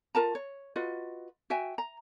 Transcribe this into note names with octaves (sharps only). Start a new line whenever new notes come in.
F4 A#4 A5 A#5
C#5
F4 F#4 B4 D#5
F#4 E5 G5 G#5
A#5